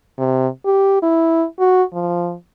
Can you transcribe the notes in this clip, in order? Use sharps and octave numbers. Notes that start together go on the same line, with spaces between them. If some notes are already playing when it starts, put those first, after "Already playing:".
C3
G4
E4
F#4
F3